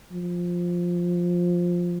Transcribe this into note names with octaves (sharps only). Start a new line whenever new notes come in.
F3